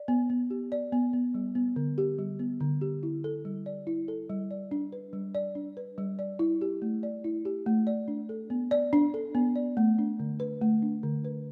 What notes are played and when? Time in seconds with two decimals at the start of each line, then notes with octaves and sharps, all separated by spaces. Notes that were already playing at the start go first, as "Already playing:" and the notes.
Already playing: D5
0.08 B3
0.30 B3
0.50 G4
0.72 D5
0.92 B3
1.13 B3
1.35 G3
1.55 B3
1.76 D3
1.98 G4
2.19 G3
2.39 B3
2.60 D3
2.81 G4
3.03 E4
3.24 A4
3.45 G3
3.66 D5
3.87 E4
4.08 A4
4.30 G3
4.51 D5
4.71 D4
4.93 B4
5.13 G3
5.35 D5
5.55 D4
5.77 B4
5.98 G3
6.19 D5
6.39 E4
6.61 G4
6.82 A3
7.03 D5
7.24 E4
7.45 G4
7.66 A3
7.87 D5
8.08 D4
8.29 A4
8.50 B3
8.71 D5
8.93 D4
9.14 A4
9.35 B3
9.56 D5
9.77 A3
9.98 D4
10.20 D3
10.40 B4
10.61 A3
10.82 D4
11.03 D3
11.25 B4